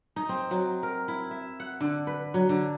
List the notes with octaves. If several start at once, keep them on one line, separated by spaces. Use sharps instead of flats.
D#4
C4
F#3
A#4
E4
E5
F#5
D3
B4
F#3
D3